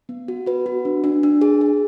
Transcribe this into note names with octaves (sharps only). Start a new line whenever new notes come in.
B3
F#4
F#4 B4
F#4
D4
D4
D4
G#4
G#4